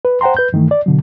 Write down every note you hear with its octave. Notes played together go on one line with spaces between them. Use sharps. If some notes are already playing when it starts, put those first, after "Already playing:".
B4
C5 F#5 G5 A#5 C6
B4 G6
G2 D#3 E3 A3
D5
B2 D3 F#3